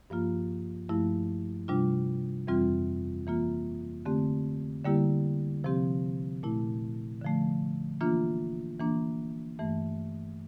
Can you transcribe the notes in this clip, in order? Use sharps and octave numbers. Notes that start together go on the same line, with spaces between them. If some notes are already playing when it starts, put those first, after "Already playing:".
G2 F3 A#3 F4
G2 F3 A3 E4
C3 G3 D4 F4
F2 E3 G3 C4 F4
E3 A#3 F4
D3 A3 C4 G4
D3 G3 A#3 E4 G4
C3 F3 C4 G4
A#2 A3 E4
D3 F3 A3
E3 A#3 D4 F4
E3 A#3 D4
G2 E3 A3